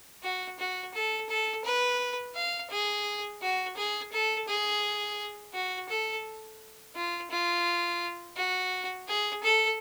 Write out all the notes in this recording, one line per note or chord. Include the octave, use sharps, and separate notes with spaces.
F#4
F#4
A4
A4
B4
F5
G#4
F#4
G#4
A4
G#4
F#4
A4
F4
F4
F#4
G#4
A4